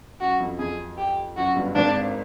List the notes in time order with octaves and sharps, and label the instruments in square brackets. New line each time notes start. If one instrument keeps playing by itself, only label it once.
[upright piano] F#2 [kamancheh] F#4
[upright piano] F2
[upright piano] F2 [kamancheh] G#4
[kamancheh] G4
[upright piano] F#2 [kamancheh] F#4
[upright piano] G1 G2
[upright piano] G#1 G#2 [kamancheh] D4